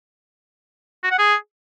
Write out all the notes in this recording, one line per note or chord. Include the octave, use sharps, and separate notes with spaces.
F#4
F#5
G#4